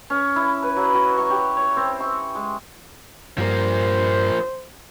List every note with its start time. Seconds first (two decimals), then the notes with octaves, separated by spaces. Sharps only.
0.10 C#4
0.36 E4
0.63 B4
0.76 F#3
0.94 F#4
1.18 C#6
1.30 G4
1.57 C#5
1.77 C4
2.00 C#6
2.35 G#3
3.38 G2 F3 A#3 C5